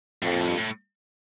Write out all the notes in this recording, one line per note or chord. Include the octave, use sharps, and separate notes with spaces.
F2 A2
A#2
A2
G2
A2